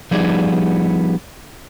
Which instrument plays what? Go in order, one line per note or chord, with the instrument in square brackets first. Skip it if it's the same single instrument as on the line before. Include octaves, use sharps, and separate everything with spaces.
[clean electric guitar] F3 G3 B3 D#4 G#4 D5